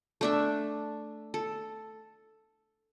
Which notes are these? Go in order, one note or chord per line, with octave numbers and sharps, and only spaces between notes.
A3 D4 E5
A4